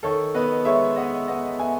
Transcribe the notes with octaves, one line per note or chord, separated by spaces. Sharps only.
D#3 A4 C#5
B3 B4 D#5
G#3 C#5 E5
B3 D#5 F#5
B3 D#5 F#5
B3 E5 G#5